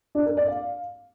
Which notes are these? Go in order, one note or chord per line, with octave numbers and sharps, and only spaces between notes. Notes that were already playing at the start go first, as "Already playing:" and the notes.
D4
A#4
D5
F5